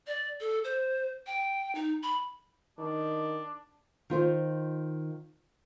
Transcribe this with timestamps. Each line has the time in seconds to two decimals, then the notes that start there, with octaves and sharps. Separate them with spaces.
0.07 D5
0.40 A4
0.64 C5
1.27 G5
1.75 D#4
2.03 B5
2.78 D#3 D4
4.10 D#3 F4 C5